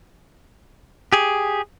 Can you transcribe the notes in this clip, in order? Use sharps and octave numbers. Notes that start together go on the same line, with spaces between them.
G4 G#4